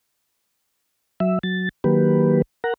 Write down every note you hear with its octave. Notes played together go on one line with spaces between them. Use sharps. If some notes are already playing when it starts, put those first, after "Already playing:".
F#3 E5
F#3 A6
D#3 F#3 A#3 G4 B4
A#4 F#5 A#5